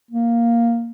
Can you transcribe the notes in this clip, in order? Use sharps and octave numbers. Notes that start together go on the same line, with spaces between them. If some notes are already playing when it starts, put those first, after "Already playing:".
A#3